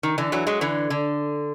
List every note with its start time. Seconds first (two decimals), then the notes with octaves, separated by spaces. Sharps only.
0.03 D#3
0.18 D3 E3
0.32 E3 F#3
0.47 F#3 G#3
0.61 D3 E3
0.90 D3